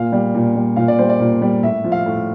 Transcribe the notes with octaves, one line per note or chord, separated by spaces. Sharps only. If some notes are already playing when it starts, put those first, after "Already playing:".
Already playing: A#2 F5
G3
A#2
G3
A#2 F5
D5
G3 C5
D5
A#2
G3
A2 E5
F3
F5
A2